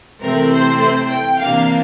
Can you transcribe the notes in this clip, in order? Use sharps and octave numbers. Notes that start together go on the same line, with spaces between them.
C3 E3 A3 C4 A#4
C5
C5
G5
C3 E3 A#3 D4 F5